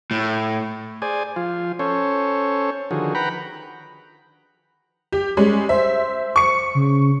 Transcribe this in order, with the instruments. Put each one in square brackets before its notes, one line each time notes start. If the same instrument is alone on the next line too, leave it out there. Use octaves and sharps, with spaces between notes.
[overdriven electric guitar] A2
[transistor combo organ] G#4 C5 D5 G#5
F3 F4
C#4 A4 C5 C#5
D3 D#3 F3 F#4 G#4
B4 F#5 G5 A#5 B5
[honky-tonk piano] G4
G3 G#3 C#4
[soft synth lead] C5 [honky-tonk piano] E5
[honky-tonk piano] C#6 C#7
[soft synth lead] C#3